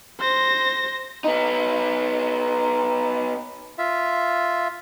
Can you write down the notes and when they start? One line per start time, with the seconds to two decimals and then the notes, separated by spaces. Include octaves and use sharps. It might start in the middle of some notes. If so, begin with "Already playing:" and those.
0.20 C5 A#6
1.24 B3 D#4
3.78 F4 E5